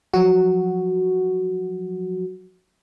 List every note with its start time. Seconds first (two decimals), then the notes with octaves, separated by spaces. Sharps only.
0.13 F3 F#3 F#4